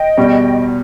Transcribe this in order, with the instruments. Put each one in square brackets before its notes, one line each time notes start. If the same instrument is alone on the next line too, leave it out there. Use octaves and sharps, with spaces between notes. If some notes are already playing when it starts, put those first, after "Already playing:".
Already playing: [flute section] D#5 G5
[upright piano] E2 B2 G3